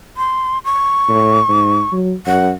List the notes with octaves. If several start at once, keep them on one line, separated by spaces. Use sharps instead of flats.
C6
C#6
A2
G#2
F#3
F#2 F#5